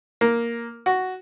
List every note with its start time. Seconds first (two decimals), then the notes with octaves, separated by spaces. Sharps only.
0.21 A#3
0.86 F#4